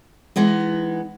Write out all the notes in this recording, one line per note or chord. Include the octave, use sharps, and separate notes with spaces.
E3 G#3 B3 D#4